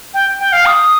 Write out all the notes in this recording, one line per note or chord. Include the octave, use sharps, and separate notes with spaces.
G5
G5
F5
D#6